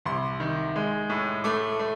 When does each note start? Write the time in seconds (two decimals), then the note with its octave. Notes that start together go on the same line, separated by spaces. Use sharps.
0.05 C2 C6
0.40 D#3
0.76 G#3
1.10 A2
1.44 A3 D6
1.79 A3